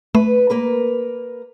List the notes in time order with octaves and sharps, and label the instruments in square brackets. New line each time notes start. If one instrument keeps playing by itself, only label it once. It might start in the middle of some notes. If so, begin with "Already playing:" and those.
[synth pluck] A3 [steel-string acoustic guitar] B4
[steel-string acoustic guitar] A#3 A#4 B4